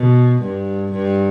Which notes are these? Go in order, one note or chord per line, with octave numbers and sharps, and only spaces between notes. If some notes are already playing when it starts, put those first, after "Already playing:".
Already playing: B2
G2
G2